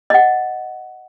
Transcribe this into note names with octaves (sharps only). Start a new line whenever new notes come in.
D#5 F#5